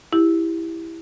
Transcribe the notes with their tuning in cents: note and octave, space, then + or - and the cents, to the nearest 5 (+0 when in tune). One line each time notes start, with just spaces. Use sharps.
E4 +0 G4 +10